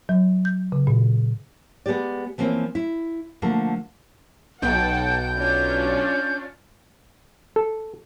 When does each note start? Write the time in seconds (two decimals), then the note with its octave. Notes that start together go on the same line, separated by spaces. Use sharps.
0.09 F#3
0.45 G6
0.72 C#3
0.87 A#2
1.86 G#3 B3 F#4 G4 D5
2.38 E3 F3 A#3 C4 C#4
2.75 E4
3.42 D3 F3 A3 A#3
4.62 B1 F#5 G5 A5 G6
5.38 C#4 D4 F4
7.56 A4